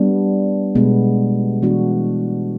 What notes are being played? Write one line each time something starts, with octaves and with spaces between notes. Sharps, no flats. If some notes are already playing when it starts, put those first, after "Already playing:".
Already playing: G3 B3 D4
B2 G#3 B3
E3 G#3 B3 D4 F#4